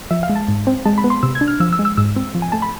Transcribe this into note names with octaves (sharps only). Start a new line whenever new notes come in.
F3 E5
F5
G#3
A5
G#2
C4
G#3 A5
B5
B3
C6
C3 E6
G#6
D4
F6
F3 E6
E6
G#3
E6
G#2 E6
C4
F3
G#5
A3 A5
B5